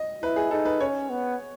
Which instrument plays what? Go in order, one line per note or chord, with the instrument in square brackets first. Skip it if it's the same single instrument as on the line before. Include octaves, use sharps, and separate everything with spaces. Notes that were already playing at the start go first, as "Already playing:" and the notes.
Already playing: [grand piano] D#5
[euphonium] E4 [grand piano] B4
[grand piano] G#4
[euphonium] D#4 [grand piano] A4
[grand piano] B4
[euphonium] C#4 [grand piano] C#5
[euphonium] B3